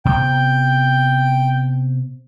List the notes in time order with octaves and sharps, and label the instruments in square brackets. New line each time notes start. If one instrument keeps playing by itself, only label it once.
[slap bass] C3 B3 [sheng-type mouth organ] G5